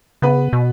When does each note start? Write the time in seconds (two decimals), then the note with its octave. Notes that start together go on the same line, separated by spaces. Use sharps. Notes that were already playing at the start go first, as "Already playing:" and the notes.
0.22 C#3 B3 B4
0.53 B2